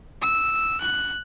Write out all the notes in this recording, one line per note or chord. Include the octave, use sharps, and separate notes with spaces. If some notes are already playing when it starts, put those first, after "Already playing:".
E6
F#6